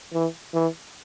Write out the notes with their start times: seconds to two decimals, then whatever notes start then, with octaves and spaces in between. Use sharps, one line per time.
0.14 E3
0.54 E3